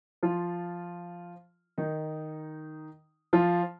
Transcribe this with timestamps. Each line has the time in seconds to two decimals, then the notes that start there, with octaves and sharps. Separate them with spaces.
0.23 F3 F4
1.78 D#3 D#4
3.33 F3 F4